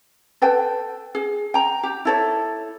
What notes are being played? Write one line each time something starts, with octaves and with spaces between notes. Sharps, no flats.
A4 B4 G5
G#4
G5 A#5
G4
E4 A4 C#5